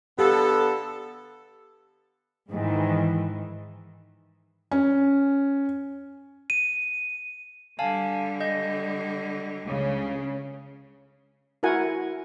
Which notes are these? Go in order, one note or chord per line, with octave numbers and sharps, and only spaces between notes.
D3 B3 G4 A4 F5
G#2 D#3 E3
C#4
D#7
D3 G3 F5 G#5 A5
D#5 G6
C#2 C#3
E4 F#4 A#4 F#5 G#5